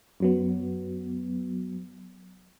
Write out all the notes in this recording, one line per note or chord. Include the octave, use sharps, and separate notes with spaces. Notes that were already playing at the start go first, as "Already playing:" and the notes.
F#2 F#3 B3